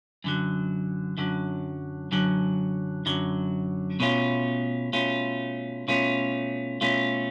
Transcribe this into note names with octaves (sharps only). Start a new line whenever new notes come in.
F#2 D3 F#3
F#2 D3 F#3
F#2 D3 F#3
F#2 D3 F#3
B2 A3 C#4 F4
B2 A3 C#4 F4
B2 A3 C#4 F4
B2 A3 C#4 F4